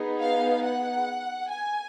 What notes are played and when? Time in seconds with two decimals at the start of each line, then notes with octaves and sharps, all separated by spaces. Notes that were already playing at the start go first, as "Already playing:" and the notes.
Already playing: B3 D#4 G#4
0.20 F5
0.63 F#5
1.50 G#5